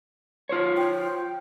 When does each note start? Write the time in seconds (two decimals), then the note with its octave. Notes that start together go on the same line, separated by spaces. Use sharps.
0.49 F4 C5 C#5
0.77 G5